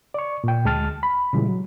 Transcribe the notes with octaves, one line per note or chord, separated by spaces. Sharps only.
D5 C#6
A#2 G5
D2 G#3 A5 F6 A6
B5
A#2 C#3 E3 G3 G#3
F#3